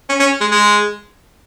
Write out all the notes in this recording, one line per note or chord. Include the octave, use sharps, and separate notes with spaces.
C#4
C#4
G#3
G#3